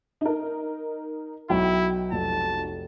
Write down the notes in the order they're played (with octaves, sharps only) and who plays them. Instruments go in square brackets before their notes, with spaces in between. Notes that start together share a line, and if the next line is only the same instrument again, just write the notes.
[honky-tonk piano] D#4 A#4
[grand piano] B1 F#3 [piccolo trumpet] E4 [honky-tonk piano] G5
[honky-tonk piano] F1 [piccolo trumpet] A5